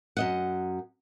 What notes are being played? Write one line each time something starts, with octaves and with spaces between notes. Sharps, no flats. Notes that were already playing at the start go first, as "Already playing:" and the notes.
F#2 D#5 F#5